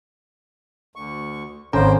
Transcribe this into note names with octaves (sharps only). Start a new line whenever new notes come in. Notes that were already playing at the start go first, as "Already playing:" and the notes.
D2 C#6
G#1 C4 C#4 A4 C5 A#5